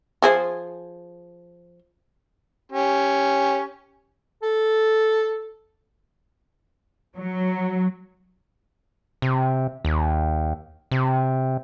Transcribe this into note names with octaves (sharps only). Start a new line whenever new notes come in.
F3 G#4 C5
C#4 G4
A4
F#3
C3
D#2
C3